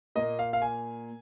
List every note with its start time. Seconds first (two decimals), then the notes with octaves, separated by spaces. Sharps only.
0.15 A#2 A#3 D#5
0.39 F5
0.53 F5
0.62 G#5